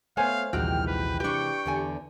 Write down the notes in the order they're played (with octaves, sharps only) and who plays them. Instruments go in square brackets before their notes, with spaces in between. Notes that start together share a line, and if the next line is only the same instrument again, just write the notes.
[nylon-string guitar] A3 B3 [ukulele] C5 C#5 G#5 [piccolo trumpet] F5
[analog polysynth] A#1 D#2 G5 [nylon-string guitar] C3 E3 G#3 [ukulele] F#4 [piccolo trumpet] F6
[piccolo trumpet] B4
[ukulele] D4 B4 [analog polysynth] G4 C#6 [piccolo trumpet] G5
[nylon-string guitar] E2 D3 G#5